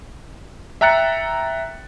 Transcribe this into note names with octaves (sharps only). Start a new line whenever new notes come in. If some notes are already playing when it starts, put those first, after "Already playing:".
E5 G5 A#5 F#6 A6 C#7